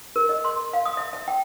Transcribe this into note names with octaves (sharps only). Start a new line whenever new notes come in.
A#4
D#5
C6
F5
D#6
E5
E5
G5